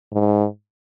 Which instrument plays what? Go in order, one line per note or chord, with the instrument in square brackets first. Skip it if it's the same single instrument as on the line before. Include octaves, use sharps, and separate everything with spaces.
[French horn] G#2